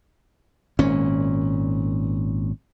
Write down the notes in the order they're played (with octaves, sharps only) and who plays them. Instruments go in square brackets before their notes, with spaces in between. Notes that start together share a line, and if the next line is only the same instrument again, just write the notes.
[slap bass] G#1 A#2 C#4